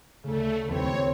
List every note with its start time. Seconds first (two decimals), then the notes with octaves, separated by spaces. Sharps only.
0.23 D2 C#3 A3
0.68 D#2 F3 C4 E4 B4 C#5